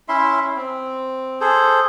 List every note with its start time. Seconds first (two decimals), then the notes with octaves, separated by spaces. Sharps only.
0.08 C#4 E4 E5 C6
0.56 C4
1.41 G#4 A4 C5